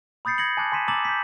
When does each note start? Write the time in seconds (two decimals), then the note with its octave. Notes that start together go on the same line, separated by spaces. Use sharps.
0.25 B5 D#6 G6 A6 C7 C#7
0.38 G6 G#6 A#6 C#7 F#7
0.57 G#5 A5 D6 F#6 G#6
0.72 G#5 C6 B6 D#7 E7
0.88 A#5 D6 E6 A6 E7 F#7
1.05 G6 B6